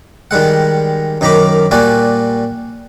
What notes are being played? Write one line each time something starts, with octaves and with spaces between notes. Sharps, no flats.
D#3 G3 G#3 F#5
F#2 D#3 D#4 A#5 B5 D6
A#2 G3 F#4 D5 G#5